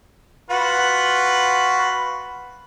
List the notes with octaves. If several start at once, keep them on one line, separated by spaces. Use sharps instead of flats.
F4 F#4 B4